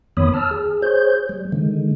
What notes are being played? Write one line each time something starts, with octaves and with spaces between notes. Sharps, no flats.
F2 D#3 B3 C#5 B5 D#6
A5 E6 F6
G#4
G#4 C5 C#5 G6
G3
D3 D#3 G#3